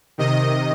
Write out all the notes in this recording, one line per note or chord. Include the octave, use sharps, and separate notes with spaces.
C3 D#3 D#5